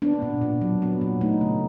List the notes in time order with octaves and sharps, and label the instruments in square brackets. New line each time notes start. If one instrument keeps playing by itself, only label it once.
[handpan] B3 D4
A#2
A#2
F#3
B3
A#2
A3 D#4
C#3